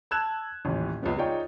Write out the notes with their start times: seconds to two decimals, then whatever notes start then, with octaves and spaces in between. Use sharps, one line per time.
0.11 A5 E6 F#6 G#6 E7
0.65 D#1 A1
1.02 C#2 C3 F3 B3 C#4
1.18 D#4 F4 G#4 C#5 D5 G5